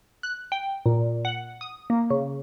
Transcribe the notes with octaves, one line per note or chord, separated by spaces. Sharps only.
F#6
G5
A#2
F#5
D#6
A#3
C#3